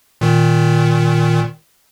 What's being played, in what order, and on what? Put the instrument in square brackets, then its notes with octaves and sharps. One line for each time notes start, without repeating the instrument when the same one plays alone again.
[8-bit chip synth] A#2 D#3